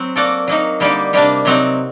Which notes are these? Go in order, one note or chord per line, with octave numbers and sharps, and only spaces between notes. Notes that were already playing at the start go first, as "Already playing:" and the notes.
Already playing: F#3 C4
A#3 F#4 A4 D5
F#3 A#3 D#4
D3 G3 A#3 D#4 G4
C3 G3 A#3 D4
C3 F#3 C4 D#4